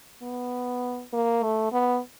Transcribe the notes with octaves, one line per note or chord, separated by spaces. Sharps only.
B3
A#3
A3
B3